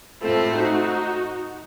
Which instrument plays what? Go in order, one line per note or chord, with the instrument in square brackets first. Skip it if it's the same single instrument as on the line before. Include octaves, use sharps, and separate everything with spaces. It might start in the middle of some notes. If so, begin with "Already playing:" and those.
[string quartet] A2 A3 C4 [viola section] F4 A4
[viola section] D#4 F#4